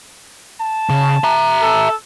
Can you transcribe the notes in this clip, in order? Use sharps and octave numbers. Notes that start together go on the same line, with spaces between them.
A5
C#3
E5 A#5
A4